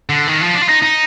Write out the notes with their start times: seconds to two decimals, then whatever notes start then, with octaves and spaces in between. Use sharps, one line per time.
0.09 D3
0.27 D#3
0.41 F3
0.55 D4
0.62 F4
0.69 D#4
0.82 D#4